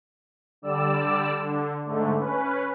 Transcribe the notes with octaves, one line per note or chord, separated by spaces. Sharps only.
D3 G3 D5 E6
D3
G#2 D3 A3
C#4 B4